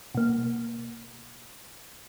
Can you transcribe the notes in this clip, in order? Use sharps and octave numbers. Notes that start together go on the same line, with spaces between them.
B2 A#3